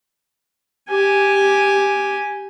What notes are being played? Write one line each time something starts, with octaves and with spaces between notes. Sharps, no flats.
G4 G#5